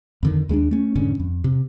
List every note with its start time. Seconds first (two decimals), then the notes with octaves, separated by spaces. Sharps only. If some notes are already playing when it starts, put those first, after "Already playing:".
0.23 F2 D3 D#3
0.49 D#2 G#3 C4 D4
0.71 A3 C#4
0.95 F1 G#2 D3 C#4
1.20 F2
1.44 C3